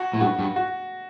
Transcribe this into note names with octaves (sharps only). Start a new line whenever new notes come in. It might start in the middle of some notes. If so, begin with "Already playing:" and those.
Already playing: F#4
A2
G2 F#4
G2
F#4